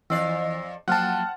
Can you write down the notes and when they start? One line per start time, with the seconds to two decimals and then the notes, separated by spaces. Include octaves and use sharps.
0.10 F2 E3 D5 E6 C7
0.88 F3 F#3 A#3 F#5 G5 A5 F6 F#6